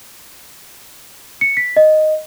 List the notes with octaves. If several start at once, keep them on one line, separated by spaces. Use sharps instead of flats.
C#7
B6
D#5